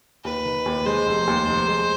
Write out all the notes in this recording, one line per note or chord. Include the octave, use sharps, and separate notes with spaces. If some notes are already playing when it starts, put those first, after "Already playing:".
D#2 B4
D#3
D#2
G#3 C5
F1
D#2
F1
G#3